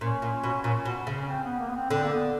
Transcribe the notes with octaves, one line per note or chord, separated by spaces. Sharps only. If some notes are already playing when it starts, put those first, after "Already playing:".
A#2 C#4
A#2
B2
A#2
B2
C#3
C#4
C4
B3
A#3
B3
C4
D3 C4
A#3
B3